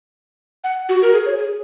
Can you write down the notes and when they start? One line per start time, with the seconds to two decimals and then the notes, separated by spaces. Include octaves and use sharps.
0.64 F#5
0.89 F#4
1.02 A#4
1.13 G#4
1.26 C#5
1.38 G#4